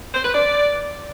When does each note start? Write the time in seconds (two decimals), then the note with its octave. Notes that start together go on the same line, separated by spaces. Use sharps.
0.14 C5
0.24 B4
0.34 D5